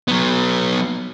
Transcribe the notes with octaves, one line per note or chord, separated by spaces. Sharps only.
F#3 B3